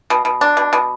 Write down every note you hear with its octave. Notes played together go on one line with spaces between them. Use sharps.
B2
B2
D4
B2
B2